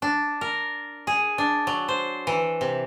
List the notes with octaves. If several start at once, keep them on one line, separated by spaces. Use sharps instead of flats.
D4
A#4
G#4
D4
F#3
C5
E3
C3